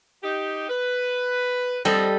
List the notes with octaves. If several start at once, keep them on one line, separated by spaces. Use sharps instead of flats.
D#4 G4
B4
F3 G3 C4 A4 D#5